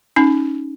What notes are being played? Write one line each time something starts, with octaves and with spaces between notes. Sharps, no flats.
C#4 D#4